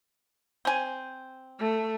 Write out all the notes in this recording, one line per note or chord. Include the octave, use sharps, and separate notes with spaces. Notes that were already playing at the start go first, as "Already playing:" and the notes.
C4 G#5
A3